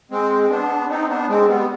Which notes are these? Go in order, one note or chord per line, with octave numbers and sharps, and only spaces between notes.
G#3 C4
C4
B3 D4
C4 D#4
B3 D4
G#3 C4
G3 B3